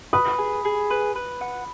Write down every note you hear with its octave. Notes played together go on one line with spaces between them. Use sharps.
B4 B5 D#6
G#4
G#4
B4
B4
F#5